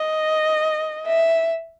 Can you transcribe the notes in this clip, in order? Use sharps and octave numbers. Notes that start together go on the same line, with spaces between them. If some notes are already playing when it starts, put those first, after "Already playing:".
Already playing: D#5
E5